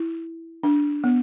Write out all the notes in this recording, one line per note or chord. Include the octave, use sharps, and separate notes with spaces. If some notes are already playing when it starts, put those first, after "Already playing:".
Already playing: E4
D4
B3